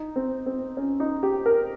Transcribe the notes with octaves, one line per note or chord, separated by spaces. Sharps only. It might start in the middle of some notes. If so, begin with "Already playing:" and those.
Already playing: D#4
C4
C4
C#4
D#4
G4
A#4